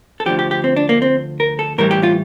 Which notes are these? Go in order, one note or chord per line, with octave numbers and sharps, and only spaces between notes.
A4
D2 D3 F3 G4
G4
G4
C4
D4
A#3
C4
A#4
A4
A2 E3 G3 A#4
G4
F4